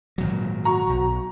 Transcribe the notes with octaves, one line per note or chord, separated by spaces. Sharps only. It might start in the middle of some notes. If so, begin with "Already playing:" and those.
G#1 A#2 F#3
F#4 A#5 C#6
B1